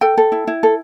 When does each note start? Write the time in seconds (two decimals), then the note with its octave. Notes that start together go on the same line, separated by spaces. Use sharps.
0.01 A4 G5
0.18 A4
0.32 E4
0.47 E4
0.63 A4